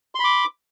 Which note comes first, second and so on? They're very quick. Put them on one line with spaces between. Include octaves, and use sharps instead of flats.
C6 B5 D6